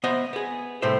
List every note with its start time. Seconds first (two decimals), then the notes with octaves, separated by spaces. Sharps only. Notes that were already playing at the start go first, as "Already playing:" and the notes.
0.04 B3 C5 D#5 E5
0.33 B3 G#4
0.82 C2 A2 A3 C5 E5